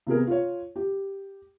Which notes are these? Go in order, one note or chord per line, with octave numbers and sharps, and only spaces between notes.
C3 B3 G#4 A#4
F4 C#5
G4